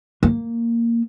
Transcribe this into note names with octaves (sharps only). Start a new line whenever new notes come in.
A#3